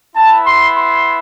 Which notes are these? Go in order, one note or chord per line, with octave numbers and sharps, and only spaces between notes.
B3 E4 A5
C6
C6